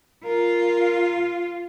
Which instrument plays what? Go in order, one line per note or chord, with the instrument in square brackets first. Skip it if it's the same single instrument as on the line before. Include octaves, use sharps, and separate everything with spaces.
[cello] F4 [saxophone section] A#4